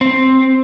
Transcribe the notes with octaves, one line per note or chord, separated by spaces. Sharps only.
C4